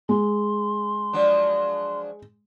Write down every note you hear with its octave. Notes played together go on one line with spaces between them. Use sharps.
G#3 C6
F3 F#3 D4